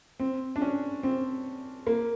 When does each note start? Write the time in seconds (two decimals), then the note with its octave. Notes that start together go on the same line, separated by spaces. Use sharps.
0.20 C4
0.56 D4
0.61 C#4
1.03 C4
1.87 A#3